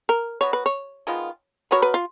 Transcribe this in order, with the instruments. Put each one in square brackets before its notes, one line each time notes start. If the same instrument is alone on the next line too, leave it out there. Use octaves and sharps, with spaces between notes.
[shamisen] A#4
[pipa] F#3 B3 F#4 [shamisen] C#5
[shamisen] B4
C#5
[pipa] D#3 G#3 B3 F4
[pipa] F#3 B3 F#4 A#4 [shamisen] C#5
[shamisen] B4
F4